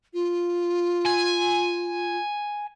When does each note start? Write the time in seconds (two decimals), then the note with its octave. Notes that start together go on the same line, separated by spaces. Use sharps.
0.14 F4
1.06 G#5